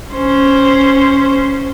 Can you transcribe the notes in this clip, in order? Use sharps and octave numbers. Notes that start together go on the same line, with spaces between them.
C#4 C5